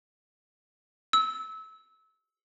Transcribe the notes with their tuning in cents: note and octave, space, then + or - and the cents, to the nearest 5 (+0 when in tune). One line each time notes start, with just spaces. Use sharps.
E6 -25